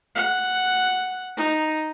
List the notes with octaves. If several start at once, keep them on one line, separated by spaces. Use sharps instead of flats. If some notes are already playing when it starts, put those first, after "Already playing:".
F#5
D#4